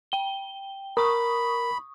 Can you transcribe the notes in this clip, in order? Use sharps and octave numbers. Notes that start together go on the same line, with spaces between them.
G5 G7
A#4 B5 C#6 D#6